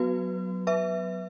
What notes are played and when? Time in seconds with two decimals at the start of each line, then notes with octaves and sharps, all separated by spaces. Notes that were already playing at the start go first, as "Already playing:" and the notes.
Already playing: F#3 B3 F#4 B4
0.67 B4 E5